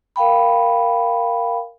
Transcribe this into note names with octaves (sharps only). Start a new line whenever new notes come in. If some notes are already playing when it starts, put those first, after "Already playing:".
A#4 F5 G5 B5